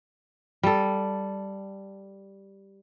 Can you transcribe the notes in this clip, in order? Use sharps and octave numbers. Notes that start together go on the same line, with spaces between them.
G3 A4